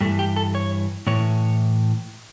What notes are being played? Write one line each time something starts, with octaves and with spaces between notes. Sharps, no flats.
G2 E3 A3
G4
A4
C#5
A2 E3 C#5